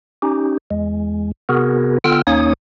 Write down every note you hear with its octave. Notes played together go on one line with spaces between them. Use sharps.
C#4 D#4 G4
E2 G#3
C3 B3 F#4 G#4 A#4
D3 B3 F4 G5 E6 F6
D#2 A#3 C#4 D#4 C#5 D#6